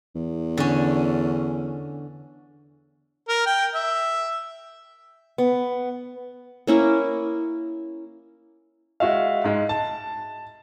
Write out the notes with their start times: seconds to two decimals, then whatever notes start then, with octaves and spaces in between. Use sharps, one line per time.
0.15 E2
0.57 D3 C#4
3.28 A#4
3.46 G5
3.75 E5
5.38 B3
6.67 A#3 C#4 E4
9.00 G#3 F#4 E5 F5
9.44 G#2 G#3
9.69 A5